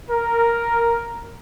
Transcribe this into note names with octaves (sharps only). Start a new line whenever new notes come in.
A#4